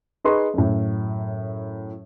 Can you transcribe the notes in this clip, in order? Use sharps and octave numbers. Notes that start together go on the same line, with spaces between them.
D#4 G#4 B4 D#5 C6 C#6
F#2 A2